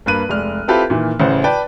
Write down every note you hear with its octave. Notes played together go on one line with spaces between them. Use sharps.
G2 A#3 B4 F#6 D#7
F1 G#3 D5 F6
C4 E4 F4 G4 A4 B4
A#2 D#3 E3
A1 C#3 C5 F#5
B4 D5 G5 A5